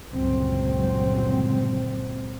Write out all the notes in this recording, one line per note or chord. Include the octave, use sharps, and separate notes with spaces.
G1 C#2 A#2 F#3 C4